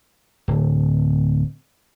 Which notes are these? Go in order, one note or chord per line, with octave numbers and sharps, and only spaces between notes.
D1